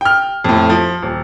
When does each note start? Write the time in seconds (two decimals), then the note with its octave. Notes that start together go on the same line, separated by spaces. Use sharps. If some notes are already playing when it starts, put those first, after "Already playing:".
0.01 G5 F6
0.44 F2 A2
0.70 F3
1.02 D#1